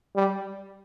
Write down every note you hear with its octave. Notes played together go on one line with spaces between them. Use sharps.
G3